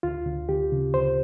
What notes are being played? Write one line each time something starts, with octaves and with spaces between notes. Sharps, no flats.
D2 F4
D2
D2 G4
C#3
D2 C5